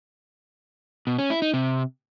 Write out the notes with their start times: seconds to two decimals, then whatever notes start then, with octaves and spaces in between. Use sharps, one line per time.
1.07 B2
1.19 C#4
1.30 E4
1.42 D#4
1.54 C3